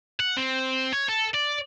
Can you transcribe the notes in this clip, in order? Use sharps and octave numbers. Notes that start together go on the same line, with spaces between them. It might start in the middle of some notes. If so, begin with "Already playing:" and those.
F#5
C4
C#5
A4
D5